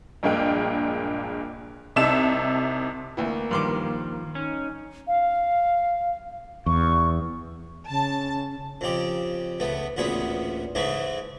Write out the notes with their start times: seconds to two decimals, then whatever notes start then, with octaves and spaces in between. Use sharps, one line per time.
0.23 A#1 G2 G#3 A#3 G5
1.96 C2 C3 D#4 E5 A5 E7
3.17 D2 E3 A#3
3.51 G2 D#3 F3 C6 D6
4.35 C#4 D#4
5.07 F5
6.66 E2 C#6
7.89 C#3 A5
8.81 F2 C#3 G4
9.60 C#2 A3 B3
9.97 A1 D2 A#2 B3 G#4 B5
10.75 G#2 C#3 E3 G#3 A3